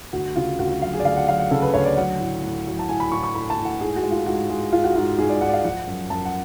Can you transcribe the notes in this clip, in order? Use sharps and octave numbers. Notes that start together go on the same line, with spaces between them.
D2 F#4
C#3 F4
D2 F#4
F#4
F#3 F5
G#4
D5
D2 F5
F#5
F#3 F5
F#5
C#3 A4
B4
D2 C#5
D5
F#3 F#5
A2
A2
F#3
A5
A2 G#5
B5
A2 C#6
C#6
A2 B5
A5
A2
F#5
G#2 G#4
F#4
G#3
F4
G#2 F#4
G#3
G#3 F4
F#4
G#2 F4
G#2 G#4
D5
G#2 F#5
D5
F5
F3 F#5
F#2
F#2 A5
F#5